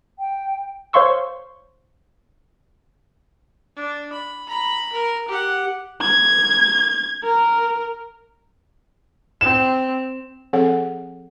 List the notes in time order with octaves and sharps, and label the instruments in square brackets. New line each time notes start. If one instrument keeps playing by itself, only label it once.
[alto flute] G5
[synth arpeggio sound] C5 C#5 F5 C6 C#6 E6
[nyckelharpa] D4
B5
A#5 B5
A#4
G4 F#5
[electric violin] G#6
A#4
[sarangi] C4 [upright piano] E7
[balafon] F3 C4 G#4 A4 C#5 F#5